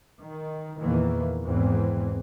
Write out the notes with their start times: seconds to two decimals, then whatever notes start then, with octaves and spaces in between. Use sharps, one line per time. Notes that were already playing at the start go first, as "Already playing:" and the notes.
0.21 D#3
0.80 E2 A#2 D#3 E3 A#3
1.44 G#1 E2 G#2 E3 C4